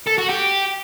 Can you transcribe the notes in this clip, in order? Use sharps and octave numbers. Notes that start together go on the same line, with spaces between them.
A4
F#4
G4